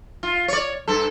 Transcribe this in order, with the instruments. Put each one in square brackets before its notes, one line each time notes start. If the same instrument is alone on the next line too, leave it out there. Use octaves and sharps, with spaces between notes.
[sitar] F4
C#5 D5
G2 A4